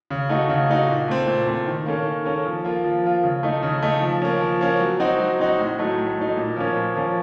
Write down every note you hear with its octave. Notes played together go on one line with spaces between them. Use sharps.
C#3
A3 D#4 F#4
C#3
A3 D#4 F#4
A#2
A3 C4
A#2
A3 C4
D#3
A#3 C#4 A4
D#3
A#3 C#4 A4
F3
A#3 F4
F3
A#3 F4
C#3
A3 D#4
C#3
A3 D#4
F3
A#3 C#4
F3
A#3 C#4
F#3
C4 D#4 F#4
F#3
C4 D#4 F#4
A2
F#3 A3 D#4
A2
F#3 A3 D#4
A#2
F3 A#3 C#4
A#2
F3 A#3 C#4